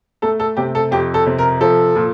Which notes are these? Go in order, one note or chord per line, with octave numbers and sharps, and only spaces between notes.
A3 A4
A4
C3 G4
A4
F2 G4
A4
C3
A#4
F3 A4
A#2